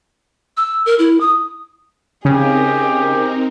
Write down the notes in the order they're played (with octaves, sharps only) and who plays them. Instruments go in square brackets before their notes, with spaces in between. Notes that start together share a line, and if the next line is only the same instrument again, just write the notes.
[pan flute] E6
A#4
E4
D#6
[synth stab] C#3 [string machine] C4 D#4 A#4 [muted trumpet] G4 [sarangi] G#4